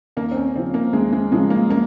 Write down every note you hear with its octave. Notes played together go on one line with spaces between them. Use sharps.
D#2 A#3
C4
C#4
C#3 F3 C4
A#3
D#2 G#3
G#3
C#3 F3 G#3
A#3
A#3